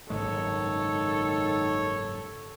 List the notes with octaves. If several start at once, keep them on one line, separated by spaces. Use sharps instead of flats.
F#1 G#2 D#3 G#3 A4 C#5